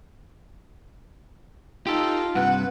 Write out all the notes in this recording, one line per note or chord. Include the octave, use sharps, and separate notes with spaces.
D#4 F4 G4 A4
G2 C3 B4 F#5